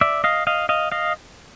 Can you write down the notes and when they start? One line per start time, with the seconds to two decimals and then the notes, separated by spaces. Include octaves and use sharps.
0.01 D5 E5
0.24 D#5 F5
0.47 D#5 F5
0.69 D#5 F5
0.92 D#5 F5